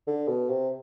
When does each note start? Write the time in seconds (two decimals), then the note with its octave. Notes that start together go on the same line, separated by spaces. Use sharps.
0.07 D3
0.29 B2
0.50 C3